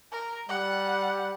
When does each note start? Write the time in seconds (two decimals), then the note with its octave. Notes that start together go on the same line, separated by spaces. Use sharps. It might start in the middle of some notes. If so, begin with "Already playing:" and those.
0.12 A#4
0.49 G3 F#5